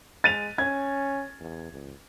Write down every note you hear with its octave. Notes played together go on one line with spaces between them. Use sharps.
G#3 A6 D#7 F7
C#4 G#6
E2
C#2